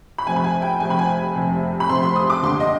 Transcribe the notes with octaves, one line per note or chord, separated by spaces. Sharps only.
B5
F1 F2 C3 G#5
B5
G#5
G5
F1 F2 C3 G#5
B5
G#5
F1 F2 C3
B5
F1 F2 C3 C6
C6
D#6
D6
D#2 D3 G3 C6
D#5